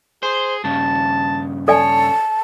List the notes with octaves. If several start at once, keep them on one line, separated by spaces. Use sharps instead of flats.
G#4 C5
G2 C#3 A5
A4 C#5 D5 G#5 A5